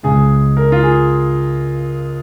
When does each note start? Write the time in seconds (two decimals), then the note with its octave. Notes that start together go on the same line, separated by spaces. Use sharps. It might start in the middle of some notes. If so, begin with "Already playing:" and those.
0.03 C#2 C#3 G#3 G#4
0.57 A#4
0.72 F4
0.83 G#4